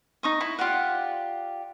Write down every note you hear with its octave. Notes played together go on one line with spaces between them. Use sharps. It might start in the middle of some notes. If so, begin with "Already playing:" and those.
D#4 C#6 D#6
E4
F4 G4 D5 F#5